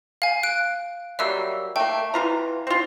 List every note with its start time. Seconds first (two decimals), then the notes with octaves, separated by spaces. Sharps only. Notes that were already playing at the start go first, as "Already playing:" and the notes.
0.22 F5 G#5
0.43 F#6 D7
1.19 F#3 G3 A#3 E5 E6
1.76 A3 A#3 G5
2.14 E3 F4 A#5
2.67 C4 F4